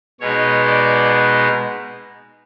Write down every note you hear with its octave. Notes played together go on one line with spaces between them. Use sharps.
B2 G#3 B3 D#4 C#5
D5